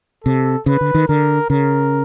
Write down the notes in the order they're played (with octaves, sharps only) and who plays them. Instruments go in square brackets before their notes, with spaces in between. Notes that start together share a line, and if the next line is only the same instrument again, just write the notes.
[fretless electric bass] C3 [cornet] A4
[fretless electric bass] C#3 [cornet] B4
[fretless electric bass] D3
D#3
[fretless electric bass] D3 [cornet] A#4
[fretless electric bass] C#3 [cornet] A#4